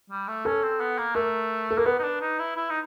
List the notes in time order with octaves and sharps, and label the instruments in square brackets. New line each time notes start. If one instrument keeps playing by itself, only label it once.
[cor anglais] G3
A3
[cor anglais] C#4 [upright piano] A4
[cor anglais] C4
B3
A#3
[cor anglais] A3 [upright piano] A#4
[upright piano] A4
[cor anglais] A#3 [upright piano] A#4
[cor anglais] B3 [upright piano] B4
[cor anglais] D#4
D4
D#4
E4
E4
D#4